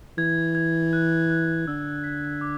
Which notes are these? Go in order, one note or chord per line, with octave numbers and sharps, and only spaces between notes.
E3 G#6
G#6
F#6
F#6
D3 E6
B6
D6